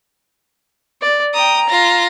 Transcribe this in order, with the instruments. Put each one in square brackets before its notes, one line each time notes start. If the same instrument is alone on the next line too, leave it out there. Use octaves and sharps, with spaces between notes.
[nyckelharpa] D5
[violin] G5 D#6 [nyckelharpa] A#5
[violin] F4 A#6